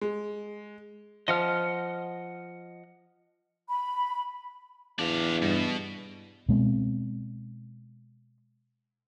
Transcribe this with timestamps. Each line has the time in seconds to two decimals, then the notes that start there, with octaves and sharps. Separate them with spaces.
0.01 G#3
1.28 F3 D#5 F#5 F6
3.69 B5
4.99 E2 D4 F5
5.42 G2 B2
6.49 B2 G#3 C4